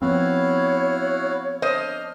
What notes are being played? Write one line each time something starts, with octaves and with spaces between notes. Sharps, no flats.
F3 B3 C4 E4 F#4 C#5 F5
D4 C5 D#5 F6